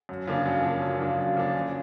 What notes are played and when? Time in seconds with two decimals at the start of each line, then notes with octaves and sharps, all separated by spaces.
0.09 F#2
0.27 C#3 F3 A#3 D4
0.46 F#2
0.63 C#3 F3 A#3 D4
0.82 F#2
1.00 C#3 F3 A#3 D4
1.18 F#2
1.36 C#3 F3 A#3 D4
1.55 C#3